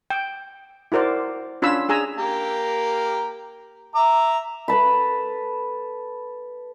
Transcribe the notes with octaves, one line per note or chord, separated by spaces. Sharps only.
G5
E4 F#4 A#4 C5 D5
C#4 D4 F4 C#5 B5 E6
D4 G#4 G#5 A#5 E6
A#3 G4 A#4
E5 A#5 D6
A4 B4 A5 B5